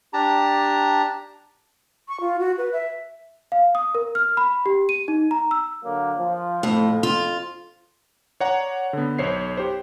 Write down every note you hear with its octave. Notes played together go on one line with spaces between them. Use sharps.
D4 G4 A5 A#5
C#6
F4
F#4
B4
E5
F5
D#6
A#4
F6
B5
G4
D#7
D#4
A#5
E6
D3 F#3 A#3
F3
F2 A2
F4
C#5 D5 F#5 A#5
D3 B3
B1 C5 C#5 C7
G4 C5